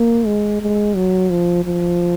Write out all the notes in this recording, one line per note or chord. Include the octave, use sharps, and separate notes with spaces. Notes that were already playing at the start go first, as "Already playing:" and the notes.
Already playing: A#3
G#3
G#3
F#3
F3
F3